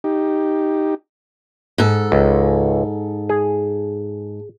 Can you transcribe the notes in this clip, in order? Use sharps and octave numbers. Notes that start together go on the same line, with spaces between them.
D#4 G4
G#2 A4
C#2
G#4